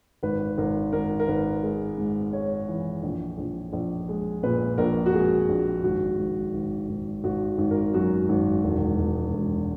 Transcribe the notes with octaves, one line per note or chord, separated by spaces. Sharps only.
G#1 B4
G#1 A#4
G#1 A#4
A#4
G#1 B4
G#3
G#2
G#3 C#5
E3
A#1
A#1
A#1
G#3
A#2 B4
A#1 A#4
F#4
G#3 G#4
A#1
G#1 F#4
G#1
G#1
G#1
G#1 F#4
G#1
A#4
F#2 F#4
G#1
E1
E1
E1